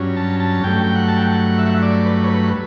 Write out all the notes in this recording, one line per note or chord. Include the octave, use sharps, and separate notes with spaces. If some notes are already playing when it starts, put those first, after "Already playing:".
Already playing: G2 F#3 C#4
A5
A5
G2 F#3 A3 G5
G5
F#5
A5
G5
F#5
E5
F#5
E5
D5
B4
C#5
B4